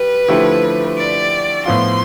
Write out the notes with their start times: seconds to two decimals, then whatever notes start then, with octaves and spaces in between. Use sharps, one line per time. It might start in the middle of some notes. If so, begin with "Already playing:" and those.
Already playing: G3 B4
0.28 D3 F3 A3 E4 G4
0.97 D5
1.65 A2 F3 B3 F4 C6